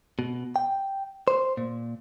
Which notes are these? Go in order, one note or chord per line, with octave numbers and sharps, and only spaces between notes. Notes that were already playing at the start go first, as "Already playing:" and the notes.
B2
G5
C5
A#2